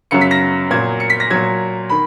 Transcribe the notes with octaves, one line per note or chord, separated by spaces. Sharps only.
F#2 C#3 F#3 C#7
B6
A#6
A#2 F#3 G#6
C#7
B6
A#6
A#2 F#3 G#6
D#3 B5